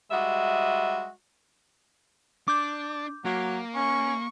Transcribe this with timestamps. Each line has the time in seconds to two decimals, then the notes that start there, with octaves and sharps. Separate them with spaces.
0.11 G3 G#3 F#4 D#5 E5
2.48 D4 D6 G6
3.25 F#3 A#3
3.75 C#4 C#6